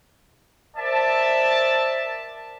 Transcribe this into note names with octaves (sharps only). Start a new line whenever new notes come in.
A#4 C5 D5 E5 A5